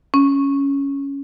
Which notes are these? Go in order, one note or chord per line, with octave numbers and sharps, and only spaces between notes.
C#4